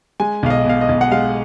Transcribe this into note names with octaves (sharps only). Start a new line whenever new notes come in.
G#3 G#5
B1 F5
D#5
B2 F5
D#5
B1
F#5
G#3 F5